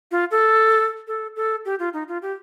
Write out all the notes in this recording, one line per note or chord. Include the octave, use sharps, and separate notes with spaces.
F4
A4
A4
A4
G4
F4
D#4
F4
G4